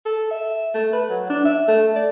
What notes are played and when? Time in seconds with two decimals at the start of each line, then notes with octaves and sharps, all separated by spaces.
0.05 A4
0.31 E5
0.74 A3
0.93 B4
1.10 F#3
1.30 D4
1.45 E5
1.68 A3
1.96 D5